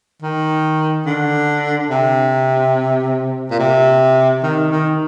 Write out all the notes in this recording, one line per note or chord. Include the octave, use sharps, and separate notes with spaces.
D#3
D3
C3
A#2
C3
D#3
D#3